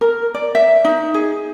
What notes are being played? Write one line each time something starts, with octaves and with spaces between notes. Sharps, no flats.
A#4
D5
E5
D#4
G#4